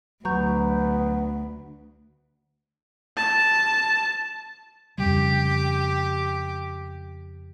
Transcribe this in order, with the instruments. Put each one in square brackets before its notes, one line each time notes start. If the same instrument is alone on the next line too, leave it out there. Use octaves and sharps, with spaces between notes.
[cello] D2 [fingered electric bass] F#3 [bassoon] B3 [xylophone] A#5 C#6 G6
[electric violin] A5
[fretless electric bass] F2 C#3 G3 [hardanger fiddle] G4